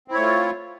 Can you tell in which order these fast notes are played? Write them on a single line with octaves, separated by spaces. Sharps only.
C4 E4 C#5 A3 F4